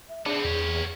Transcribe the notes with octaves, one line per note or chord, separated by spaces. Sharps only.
E5
B3 C4 D4 G#4
E2 G4 C#5